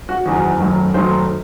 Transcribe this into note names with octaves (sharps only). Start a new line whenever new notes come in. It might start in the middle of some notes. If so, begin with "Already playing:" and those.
F#4
F#1 E2 D#3 F#4
F#1 F#2 D#3 F#3 A3
F#1 F#2 D#3 F#3 A3 C5